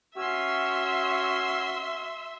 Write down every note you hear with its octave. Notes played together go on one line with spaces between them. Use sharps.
C#4 F#4 E5 C6 E6